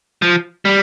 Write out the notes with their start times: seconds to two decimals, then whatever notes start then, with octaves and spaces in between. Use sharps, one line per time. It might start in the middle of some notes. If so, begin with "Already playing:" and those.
0.22 F3
0.65 G3